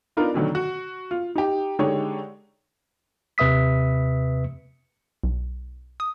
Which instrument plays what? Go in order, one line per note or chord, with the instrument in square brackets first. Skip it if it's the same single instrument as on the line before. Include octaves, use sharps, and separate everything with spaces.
[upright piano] B3 D4 D#4 F4 A#4
B2 D3 D#3 F#3
F#4
F4
D#4 G4
D3 G#3 D#4 G4 C#5
[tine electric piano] D#2 C3 B4 E5 D#6 B6
[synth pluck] B1
D#6